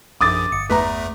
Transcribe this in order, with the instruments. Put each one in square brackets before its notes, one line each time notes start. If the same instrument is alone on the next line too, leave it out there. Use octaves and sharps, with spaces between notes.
[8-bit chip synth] A#1 F#2 [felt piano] D6 D#6 A6
[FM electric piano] G1 [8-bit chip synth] C#7
[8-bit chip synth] E2 A3 [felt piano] B4 A#5